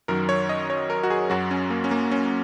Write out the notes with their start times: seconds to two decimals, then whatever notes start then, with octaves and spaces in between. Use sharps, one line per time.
0.08 F#2 D#3 F#3 A#4
0.29 C#5
0.49 D#5
0.70 C#5
0.90 A#4
1.03 F#4
1.10 G#4
1.30 F#2 F#3 F#4
1.51 C#4
1.70 A#3
1.84 C#4
1.91 A#3
2.11 C#4